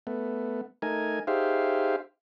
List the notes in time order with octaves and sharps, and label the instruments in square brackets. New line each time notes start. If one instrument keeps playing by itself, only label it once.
[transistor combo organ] A3 B3
A3 D#4 A#4 G#5
D#4 G4 G#4 C5 E5 F5